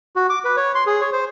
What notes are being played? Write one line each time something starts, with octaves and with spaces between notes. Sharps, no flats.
F#4
D6
B4
C#5
C6
G#4
C#5
C5